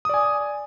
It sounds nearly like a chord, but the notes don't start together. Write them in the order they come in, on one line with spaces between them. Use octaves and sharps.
D#6 D5 G#5